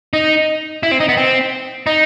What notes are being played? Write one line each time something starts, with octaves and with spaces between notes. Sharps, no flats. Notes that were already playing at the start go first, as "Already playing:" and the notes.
D#4
E4
C4
D#4
B3
C4
D#4